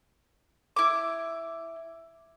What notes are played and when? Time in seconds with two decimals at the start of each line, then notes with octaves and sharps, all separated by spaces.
0.76 E4 D6